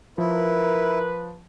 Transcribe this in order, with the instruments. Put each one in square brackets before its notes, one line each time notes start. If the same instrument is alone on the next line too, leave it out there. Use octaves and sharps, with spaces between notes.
[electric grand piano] F3 [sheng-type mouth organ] E4 [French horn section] A#4 [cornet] B4